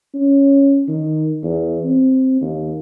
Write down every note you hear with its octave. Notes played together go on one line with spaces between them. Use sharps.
C#4
D#3
E2
C4
D#2